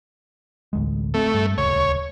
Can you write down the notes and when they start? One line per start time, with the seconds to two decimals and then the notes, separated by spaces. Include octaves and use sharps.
0.73 A1 D2 G#3
1.14 A3 C4
1.34 G2
1.58 D#1 C#2 C#5